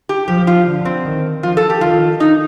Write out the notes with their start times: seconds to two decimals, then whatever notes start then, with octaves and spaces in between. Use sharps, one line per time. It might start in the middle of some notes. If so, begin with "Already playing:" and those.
0.09 G4
0.28 F3 G4
0.47 F4
0.67 D3
0.85 C4
1.05 D#3
1.43 F3 F4
1.57 A4
1.70 G4
1.81 D#3 F4
2.20 D#4